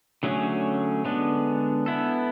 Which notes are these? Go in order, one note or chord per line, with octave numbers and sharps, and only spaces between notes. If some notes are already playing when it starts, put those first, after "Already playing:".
D3 F#3 A3 C#4 G#4
D3 G#3 B3 D4
B3 E4 A4